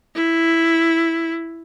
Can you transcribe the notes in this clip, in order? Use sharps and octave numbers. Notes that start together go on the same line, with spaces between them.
E4